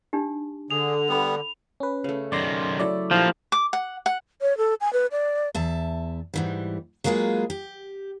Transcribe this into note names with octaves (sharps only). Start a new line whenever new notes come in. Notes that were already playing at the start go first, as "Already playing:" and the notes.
D4 D#4 G4
D3 G#4 F7
G3 B3 A4 B5
C#4 B4
C#3 A3
F#2 D#3 D5 C6 A#6
F#3 A3 E4 D5
F3 A#3 D4 E4 F4 G4
D6
F#5
F#5
C#5
A4
G#5
B4
D5
E2 E5 A5
G#2 E3 G3
F#3 G#3 A#3 F4 G#4 B4
G4